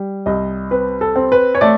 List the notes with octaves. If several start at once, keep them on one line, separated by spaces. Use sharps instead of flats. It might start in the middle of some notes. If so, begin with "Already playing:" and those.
Already playing: G3
C2 D#5
C4 B4
A4
C4
B4
C#5
A3 D5